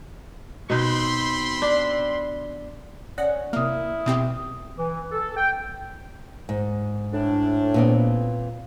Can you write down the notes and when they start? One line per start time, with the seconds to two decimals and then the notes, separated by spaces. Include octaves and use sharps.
0.70 B2 C4 D#4 B5 C6
1.62 D4
3.18 C#4 D5 F#5
3.53 C3 A#3 E4 D#6 F6
4.06 B2 C4 G4 D#6
4.77 E3
5.12 A4
5.37 G5
6.49 G#2
7.13 A2 D4
7.74 A#2 B3 C4